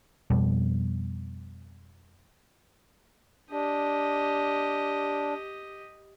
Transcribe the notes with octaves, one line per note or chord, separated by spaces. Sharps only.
F2 B2 G3
D4 G4 D#5